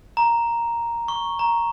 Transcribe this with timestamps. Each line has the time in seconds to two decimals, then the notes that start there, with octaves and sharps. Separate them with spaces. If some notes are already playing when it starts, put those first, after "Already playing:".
0.17 A#5
1.08 C#6
1.39 A#5